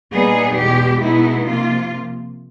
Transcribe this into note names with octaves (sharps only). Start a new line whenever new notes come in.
A#2 G3 B3 D#4 G#4
E2 B2 G#3 G4
B2 G#3 B3 D#4 E4
C3 F3 A#3 F4